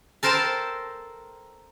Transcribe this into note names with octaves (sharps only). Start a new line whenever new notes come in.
A4 A#4 C5 G5 A5